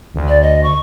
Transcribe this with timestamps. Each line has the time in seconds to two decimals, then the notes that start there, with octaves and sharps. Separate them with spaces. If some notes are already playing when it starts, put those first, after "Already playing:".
0.15 D2
0.28 D5
0.42 D#5
0.63 C#6